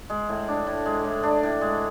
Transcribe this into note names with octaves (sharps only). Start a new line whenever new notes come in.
G#3
A2
D4
A2
G#3
A2
D4
A2
G#3